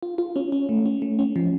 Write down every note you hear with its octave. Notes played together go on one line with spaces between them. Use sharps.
F4
F4
C#4
C#4
A3
C#4
A3
C#4
F3